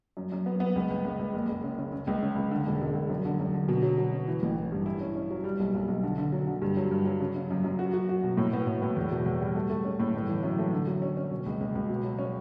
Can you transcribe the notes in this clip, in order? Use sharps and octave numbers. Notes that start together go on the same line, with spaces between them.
F#2
F#2
B3
B3
C#2
C#2
C#2
C#2
F#1
F#1
C#3
C#3
C#3
C#2
C#3
C#2
D3
E1
E1
E1
F#2
D3
F#2
D3
B2
F#3
F#3
C#4
E3
A1
E3
G2
E4
C#4
C#4
F#3
G3
B1
B1
B1
D3
D3
F#3
D3
G2
F#3
G2
F#3
C#3
C#3
F#2
F#2
F#4
F#4
F#4
B2
A2
B3
A2
A2
E2
B2
E2
G3
A3
A3
C#4
A2
G1
E3
F#2
A3
D3
F#3
C#4
C#4
B2
C#2
C#2
C#2
B2
F#3
C#4